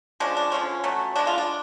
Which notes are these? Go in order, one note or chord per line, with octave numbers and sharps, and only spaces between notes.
F3 G#3 C#4 D4
D4
D3 F3 G#3 C#4
B2 F#3 A3
D3 G#3 B3 D4
F4
D4